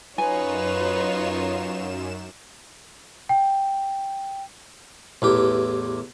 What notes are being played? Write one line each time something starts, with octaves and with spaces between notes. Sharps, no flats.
F#2 D#4 F4 B4 C#5 G#5 E7
G5
A1 E2 G4